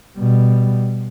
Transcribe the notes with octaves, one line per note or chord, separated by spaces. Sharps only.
B2 G3